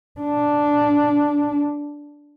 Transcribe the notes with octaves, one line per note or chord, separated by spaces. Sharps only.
D4